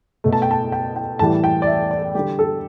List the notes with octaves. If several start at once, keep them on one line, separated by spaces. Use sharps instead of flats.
B2 A3
A5
G5
A5
G5
G5
A2 E3 G3 A5
G5
D5
E5
D5
D3 G3 G4
A4